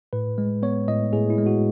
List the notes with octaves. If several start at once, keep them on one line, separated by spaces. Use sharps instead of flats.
A2 B4
G#3
B3 C#5
A2 D#5
A2 G#4
E4
G#3
F#4